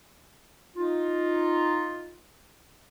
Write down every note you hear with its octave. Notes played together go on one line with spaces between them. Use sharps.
D#4 F4